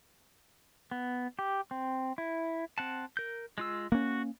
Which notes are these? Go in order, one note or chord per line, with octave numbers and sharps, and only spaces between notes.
B3
G4
C4
E4
C4 F#5 A5
A#4 G6
G#3 F4 E6
A#3 C#4 F#4